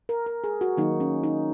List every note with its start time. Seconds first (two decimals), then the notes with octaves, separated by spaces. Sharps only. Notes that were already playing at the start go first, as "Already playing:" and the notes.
0.09 A#4
0.26 A#4
0.44 G#4
0.61 F#4
0.77 D#3 F#3 A#3 D#4
1.00 C#4
1.24 D#4